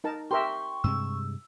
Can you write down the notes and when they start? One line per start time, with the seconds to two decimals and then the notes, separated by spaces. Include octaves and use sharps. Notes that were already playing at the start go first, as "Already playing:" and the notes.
0.04 D#4 A#4 A5
0.31 G4 A#4 E5 G5 C6 C#6
0.84 G2 C3 G#3 E6